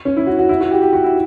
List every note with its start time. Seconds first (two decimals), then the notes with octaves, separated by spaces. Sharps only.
0.05 C#4
0.17 E4
0.27 F#4
0.39 F#4
0.49 E4
0.61 F#4
0.71 G4
0.82 G4
0.93 F#4
1.04 E4